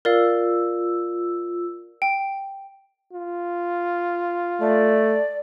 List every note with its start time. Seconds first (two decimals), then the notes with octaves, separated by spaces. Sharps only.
0.05 F4 A#4 D5 F5 E6
2.02 G5
3.13 F4
4.61 A3 D5